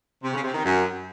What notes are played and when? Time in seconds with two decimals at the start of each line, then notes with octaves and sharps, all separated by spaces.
0.23 C3
0.33 C#3
0.44 C3
0.54 D#3
0.65 F#2